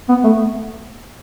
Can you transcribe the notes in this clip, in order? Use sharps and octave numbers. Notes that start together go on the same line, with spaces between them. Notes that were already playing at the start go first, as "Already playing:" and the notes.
B3
A3